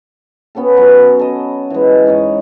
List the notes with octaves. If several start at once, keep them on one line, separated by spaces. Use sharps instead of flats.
B3 C#4 G4 A4
F#3 B4 C#5
A4 D#5
E3 G#3
G#2 C#5 D#5